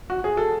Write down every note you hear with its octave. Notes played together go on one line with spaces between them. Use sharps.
F#4
G#4
A4